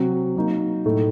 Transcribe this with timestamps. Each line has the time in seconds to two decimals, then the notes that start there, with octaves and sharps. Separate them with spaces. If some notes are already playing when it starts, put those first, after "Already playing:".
Already playing: C3 F#3 C4 F#4
0.36 F#3 A#3 D#4
0.85 A2 F#3 A3 D#4 A4